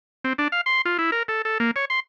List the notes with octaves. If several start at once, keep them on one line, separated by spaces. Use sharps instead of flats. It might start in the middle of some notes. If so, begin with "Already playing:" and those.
C4
D4
F5
C6
F4
E4
A#4
A4
A4
A#3
C#5
C6